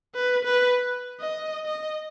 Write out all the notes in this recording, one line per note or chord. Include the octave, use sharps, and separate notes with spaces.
B4
B4
D#5
D#5